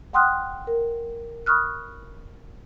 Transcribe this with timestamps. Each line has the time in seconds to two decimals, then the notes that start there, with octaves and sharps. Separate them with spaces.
0.13 F#5 G5 C6 D#6 F6 F#6
0.67 A#4
1.46 B5 C#6 D#6 F6 F#6